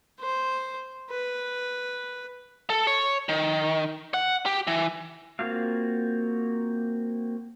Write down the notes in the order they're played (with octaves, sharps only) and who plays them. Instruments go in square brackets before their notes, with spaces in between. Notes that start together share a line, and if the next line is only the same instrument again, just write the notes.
[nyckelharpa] C5
B4
[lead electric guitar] A4
C#5
D#3
F#5
G4
E3
[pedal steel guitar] A#3 C4 F4 F#4 F5